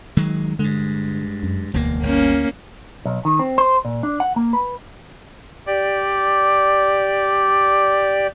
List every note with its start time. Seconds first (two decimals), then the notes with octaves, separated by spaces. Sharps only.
0.17 D#3 F#3 G#3
0.59 G2 D3 G#3
1.43 F#2
1.74 E1 D2 A#3
2.03 G1 A#3 C#4
3.05 B1
3.25 D#3
3.39 C4
3.58 C5
3.85 A#2
4.03 D4
4.20 F#5
4.36 A#3
4.53 B4
5.67 G4 D5